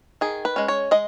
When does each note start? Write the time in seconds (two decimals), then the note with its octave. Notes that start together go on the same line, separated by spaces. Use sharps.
0.21 D#3 G#4
0.45 B4
0.56 G#3 C#4
0.68 C#5
0.91 G#3 D#5